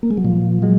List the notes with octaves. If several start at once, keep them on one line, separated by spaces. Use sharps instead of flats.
A#3
G#3
F#3
A#2 F3
F#3 G#3